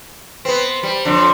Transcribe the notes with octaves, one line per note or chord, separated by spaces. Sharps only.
B3 C4 B4 C5
C5
G3
F2 D3